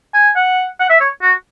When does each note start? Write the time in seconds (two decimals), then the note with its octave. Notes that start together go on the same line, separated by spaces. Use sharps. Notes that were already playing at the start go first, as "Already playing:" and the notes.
0.14 G#5
0.36 F#5
0.80 F#5
0.90 E5
1.01 C#5
1.22 F#4